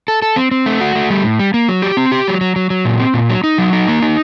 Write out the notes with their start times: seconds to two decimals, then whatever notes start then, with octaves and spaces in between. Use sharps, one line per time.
0.08 A4
0.22 A4
0.36 C4
0.51 C4
0.66 A3
0.81 F#4
0.95 A3
1.10 G3
1.24 A2
1.39 G3
1.54 A#3
1.68 F#3
1.82 G4
1.97 C4
2.12 G4
2.27 F#3
2.41 F#3
2.56 F#3
2.70 F#3
2.85 A#2
2.99 C4
3.14 A#2
3.29 F#3
3.44 D#4
3.58 F#3
3.73 D#4
3.88 A#3
4.02 D#4